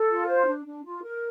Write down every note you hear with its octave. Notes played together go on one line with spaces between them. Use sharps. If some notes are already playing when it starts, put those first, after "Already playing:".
Already playing: A4
F4
C5
D4
D4
F4
A#4